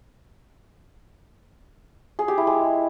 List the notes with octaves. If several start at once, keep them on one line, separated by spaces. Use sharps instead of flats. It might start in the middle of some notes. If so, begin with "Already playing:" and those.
G#4
G4
E4
G#3